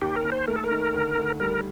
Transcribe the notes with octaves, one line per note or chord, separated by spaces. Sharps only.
D#2 G4
A#4
D#2
C5
A3 A#4
A4
A#4
D#3
D2
D2
G3 A#4